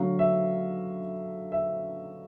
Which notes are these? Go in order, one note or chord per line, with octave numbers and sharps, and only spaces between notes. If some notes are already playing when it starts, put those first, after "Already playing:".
Already playing: D3 F#3 A3 F5
E5
E5